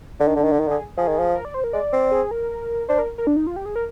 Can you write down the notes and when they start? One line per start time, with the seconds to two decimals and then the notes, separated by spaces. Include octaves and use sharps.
0.19 D3 D4
0.28 D#3
0.36 D3
0.40 D#3 D4
0.52 D3
0.59 D#3 D#4
0.68 D3 G#4
0.97 F3 G#4
1.08 D#3
1.19 F3
1.35 A#4
1.45 D5
1.54 C5
1.64 A#4
1.73 G#3 D5
1.93 C4
2.11 G#4
2.31 A#4
2.89 D4 C5
2.99 A#4
3.18 A#4
3.27 D4
3.36 D#4
3.47 F4
3.56 G4
3.66 G#4
3.76 A#4